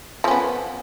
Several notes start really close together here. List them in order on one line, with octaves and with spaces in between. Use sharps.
F3 C#4 B3